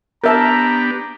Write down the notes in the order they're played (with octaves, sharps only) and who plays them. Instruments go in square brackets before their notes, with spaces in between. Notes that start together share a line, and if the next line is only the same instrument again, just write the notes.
[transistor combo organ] B3 D4 G4 [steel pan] A#4 E5 A5 [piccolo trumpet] A#5